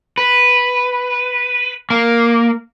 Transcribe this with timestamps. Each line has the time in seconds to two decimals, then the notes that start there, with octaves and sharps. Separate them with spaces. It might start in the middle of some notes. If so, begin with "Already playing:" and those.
0.18 B4
1.90 A#3